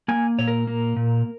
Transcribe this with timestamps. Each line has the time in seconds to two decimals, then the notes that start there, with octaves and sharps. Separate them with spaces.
0.08 A#3 G#5
0.39 A#2 C#5
0.48 A#4
0.67 A#3
0.96 A#2